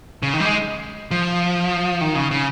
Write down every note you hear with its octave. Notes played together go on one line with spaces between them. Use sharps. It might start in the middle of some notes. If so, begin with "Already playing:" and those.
C#3
D#3
G3
G#3
F3
D#3
C#3
C#3